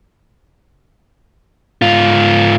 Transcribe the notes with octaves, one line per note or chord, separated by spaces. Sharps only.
G#2 F4